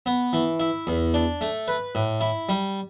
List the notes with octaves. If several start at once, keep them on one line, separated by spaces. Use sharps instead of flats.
B3
E3
E4
E2
D4
A3
B4
A2
E4
G3